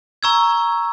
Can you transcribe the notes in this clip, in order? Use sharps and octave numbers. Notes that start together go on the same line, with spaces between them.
A#5 C#6 E6 G#6